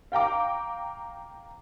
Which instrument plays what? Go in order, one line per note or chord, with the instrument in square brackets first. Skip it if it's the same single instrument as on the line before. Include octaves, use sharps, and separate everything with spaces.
[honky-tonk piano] F5 G5 A#5 D6